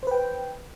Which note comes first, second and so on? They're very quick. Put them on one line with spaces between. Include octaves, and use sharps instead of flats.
C5 B4 G5